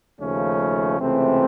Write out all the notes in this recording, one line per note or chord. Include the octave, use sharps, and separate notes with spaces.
D#2 C#3 F3 A3 C#4
C#2 C3 E3 A3 C4